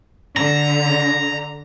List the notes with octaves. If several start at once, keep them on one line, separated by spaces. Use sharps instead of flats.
D3 A#5